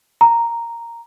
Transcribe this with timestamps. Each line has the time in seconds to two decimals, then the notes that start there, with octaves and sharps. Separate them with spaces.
0.21 A#5